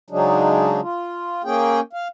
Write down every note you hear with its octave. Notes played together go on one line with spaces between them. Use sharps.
C#3 F#3 G#3 D4 D#4
F4
A#3 C#4 G#4 G5
F5